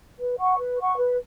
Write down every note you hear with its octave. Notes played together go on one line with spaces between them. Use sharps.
B4
F#5 C#6
B4
F#5 C#6
B4